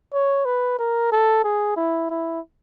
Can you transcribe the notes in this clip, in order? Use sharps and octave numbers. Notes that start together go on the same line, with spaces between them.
C#5
B4
A#4
A4
G#4
E4
E4